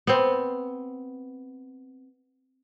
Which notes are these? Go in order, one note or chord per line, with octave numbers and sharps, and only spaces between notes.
B3 C4